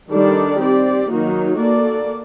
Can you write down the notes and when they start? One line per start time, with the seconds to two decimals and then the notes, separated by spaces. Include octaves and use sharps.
0.10 D#3 G3 D4 A4 D5
0.60 C4 G4 D5
1.09 D#3 F#3 A#3 D#4 F#4
1.58 A#3 F#4 A4 D5